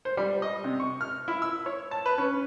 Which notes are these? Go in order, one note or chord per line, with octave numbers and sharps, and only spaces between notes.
C5
G3
D#5
C3
C#6
F6
E4
E6
C#5
A5
B4
C#4